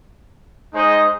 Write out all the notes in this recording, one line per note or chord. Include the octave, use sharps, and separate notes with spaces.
G#3 D#4 C5 D#5